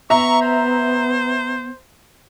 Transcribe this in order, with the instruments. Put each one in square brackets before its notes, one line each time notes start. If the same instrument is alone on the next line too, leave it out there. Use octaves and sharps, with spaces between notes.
[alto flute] B3 [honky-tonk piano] E5 A#5 [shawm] C#6
[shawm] C5